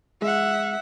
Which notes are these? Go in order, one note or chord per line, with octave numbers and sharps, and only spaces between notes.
G#3 E5 F#5